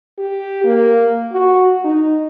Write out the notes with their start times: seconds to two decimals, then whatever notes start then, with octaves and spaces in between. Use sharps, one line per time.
0.19 G4
0.65 A#3
1.33 F#4
1.85 D#4